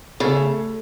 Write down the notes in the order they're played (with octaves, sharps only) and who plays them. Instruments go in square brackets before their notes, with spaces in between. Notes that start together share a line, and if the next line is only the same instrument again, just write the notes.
[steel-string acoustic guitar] C#3 [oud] A3